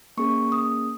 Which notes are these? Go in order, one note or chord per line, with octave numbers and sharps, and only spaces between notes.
A#3 C#4 G#4 C#6
D#6